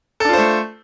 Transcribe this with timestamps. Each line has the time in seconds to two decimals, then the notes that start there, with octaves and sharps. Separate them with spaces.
0.20 A4
0.25 D4
0.29 F4
0.33 C5
0.38 A3